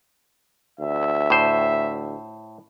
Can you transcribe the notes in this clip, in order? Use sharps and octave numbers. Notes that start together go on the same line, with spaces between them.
D2 E5
A2 C5